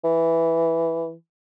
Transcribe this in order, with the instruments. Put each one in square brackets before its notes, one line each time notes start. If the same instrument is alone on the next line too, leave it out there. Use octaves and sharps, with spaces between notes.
[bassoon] E3